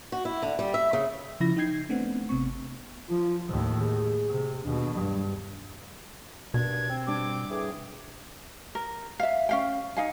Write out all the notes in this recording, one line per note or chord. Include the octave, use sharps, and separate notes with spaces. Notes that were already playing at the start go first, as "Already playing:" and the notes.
F#4
E4
D3
G3
E5
C#3
C#3 F3 E4 E5 B5 A#6
D#4 D#5 G5 G6 G#6 C7
A3 B3 C4 D4 F#5
G#1 C3 B3 C4 C#6
F3 F4
D#2 A2 D#3
G#4
C3
D#2 B2 D4
G2
G2 B2 D#3 D4 G#6
C4
G2 D4 D6
A2 E3 G#4
A#4
E5 F5
C#4 F5 G5
D#4 F5 G#5